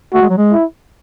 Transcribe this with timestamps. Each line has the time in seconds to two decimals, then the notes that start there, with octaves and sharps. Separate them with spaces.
0.14 A3 F#4
0.22 G#3
0.30 F#3
0.38 G#3
0.53 E4